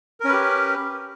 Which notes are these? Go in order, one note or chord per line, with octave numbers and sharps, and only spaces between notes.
C#4 G4 A#4 B4